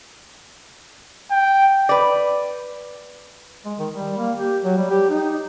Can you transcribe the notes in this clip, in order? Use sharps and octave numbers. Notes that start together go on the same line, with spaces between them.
G5
B4 D5
G#3
D#3
G3
A#3
G4
F#3
G3
G4
D#4